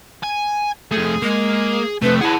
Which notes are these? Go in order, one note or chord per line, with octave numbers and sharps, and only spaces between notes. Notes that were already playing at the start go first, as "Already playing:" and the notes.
G#5
F2 A3 G#4
G#3 A#3
F2 C3 A3 B4
E4 G#4 B4 F#5 A5